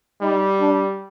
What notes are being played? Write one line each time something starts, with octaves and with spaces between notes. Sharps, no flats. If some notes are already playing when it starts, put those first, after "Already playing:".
G3 D#4
D4